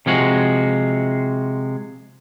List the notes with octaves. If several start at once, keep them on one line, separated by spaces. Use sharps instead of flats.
C3 F3 G#3 F#4